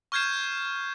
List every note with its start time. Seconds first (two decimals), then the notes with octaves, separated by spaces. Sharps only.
0.12 C#6 F6 G6 G#6 C7 E7